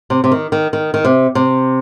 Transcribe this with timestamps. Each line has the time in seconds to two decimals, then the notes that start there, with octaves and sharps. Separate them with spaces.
0.10 C3
0.24 C3
0.32 D#3
0.52 D#3
0.73 D#3
0.94 D#3
1.04 C3
1.35 C3